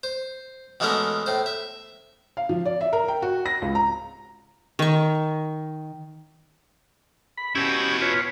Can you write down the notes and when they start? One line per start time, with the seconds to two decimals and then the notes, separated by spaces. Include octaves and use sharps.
0.03 C5
0.80 B2 E3 G#3 A3 C#4 A#4
1.26 A2 C5
1.46 E5
2.37 F5
2.49 F3
2.66 D5
2.81 E5
2.93 A#4
3.08 G5
3.22 F#4
3.46 A#6
3.62 C#2
3.75 A#5
4.79 D#3 C#6
7.37 B5
7.55 B2 C#4 E4 G4
8.02 F4 B4 C#5